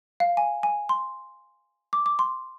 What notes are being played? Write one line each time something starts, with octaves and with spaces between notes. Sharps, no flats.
F5
G#5
G#5
C6
D6
D6
C6